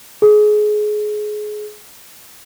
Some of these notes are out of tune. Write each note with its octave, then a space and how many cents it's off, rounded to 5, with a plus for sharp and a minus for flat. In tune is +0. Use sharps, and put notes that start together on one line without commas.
G#4 +25